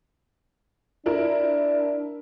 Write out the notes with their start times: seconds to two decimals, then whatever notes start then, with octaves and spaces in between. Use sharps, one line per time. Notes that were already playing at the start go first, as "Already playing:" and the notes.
1.06 D4 E4 A#4